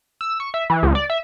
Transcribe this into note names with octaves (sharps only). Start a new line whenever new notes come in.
E6
C#6
E5
E3
C#2
D5
E5